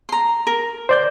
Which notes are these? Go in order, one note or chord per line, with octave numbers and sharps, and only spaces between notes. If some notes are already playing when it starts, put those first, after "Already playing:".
A#5 C6
A#4
C5 D5 G6